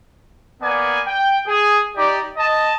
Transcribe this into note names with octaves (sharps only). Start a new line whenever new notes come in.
A#3 B3 D5 G#5
G5
G#4
D#4 G4 D5
D#5 A5